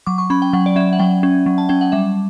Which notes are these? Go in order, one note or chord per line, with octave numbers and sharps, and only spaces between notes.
F#3 D6
C#6
C#4 B5
G5
F#3 F#5
D5
C#4 E5
F#5
F#3 G5
C#4
F#3
A5
C#4 G5
F#5
G3 E5